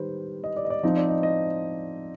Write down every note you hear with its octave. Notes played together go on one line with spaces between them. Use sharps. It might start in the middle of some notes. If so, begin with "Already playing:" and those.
Already playing: D#3 G3 B4 C5
D#5
D5
D#5
D5
F3 C4 D#4 D#5
D5
D#5
D#5